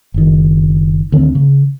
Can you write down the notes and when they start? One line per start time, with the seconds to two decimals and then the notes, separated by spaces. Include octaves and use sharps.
0.14 F#1 D#3
1.12 D2 D3 D#3 C4
1.35 C#3